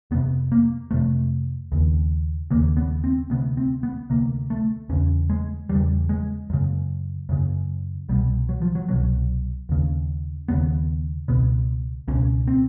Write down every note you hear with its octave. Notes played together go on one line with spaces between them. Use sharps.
F2 C3 B3
A#3
F2 C3 A3
D#2 C#3
D#2 C#3 A#3
B3
C4
D2 C3 B3
C4
B3
D2 C3 A#3
A3
E2 C#3 C#4
G#3
E2 C#3 G3
G#3
F#2 C#3
F#2 C#3
C2 B2 G3
F#3
F3
F#3
C2 B2 F#3
D#2 C#3
D#2 C#3 B3
C#2 B2 B3
C#2 B2 C#4
C4